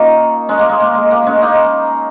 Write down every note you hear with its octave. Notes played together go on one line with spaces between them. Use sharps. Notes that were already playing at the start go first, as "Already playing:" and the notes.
Already playing: A#3 C#4 D#4 F4
G#3 C#4
A#3
G#3
A#3
G#3
A#3
G#3 C#4
A#3 D#4